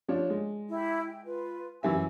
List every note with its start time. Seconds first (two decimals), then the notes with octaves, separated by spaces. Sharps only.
0.08 F3 D4 C#5
0.30 G#3
0.69 E4 G4
1.06 G5
1.25 F4 B4
1.83 F#2 E3 E5 G#5 E6